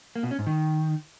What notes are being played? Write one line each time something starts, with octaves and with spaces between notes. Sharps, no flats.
A#3
B2
C#4
G#2
D#3